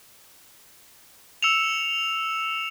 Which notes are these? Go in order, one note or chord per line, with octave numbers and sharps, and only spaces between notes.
E6 C#7 E7 F7